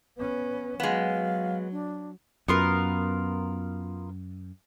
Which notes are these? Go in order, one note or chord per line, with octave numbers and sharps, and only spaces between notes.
B3 C#4 B4
F#3 G#3 B3 F5
D4
F#2 B3 F4 A#4